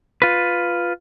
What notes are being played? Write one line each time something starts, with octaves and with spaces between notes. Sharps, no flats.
F4 B4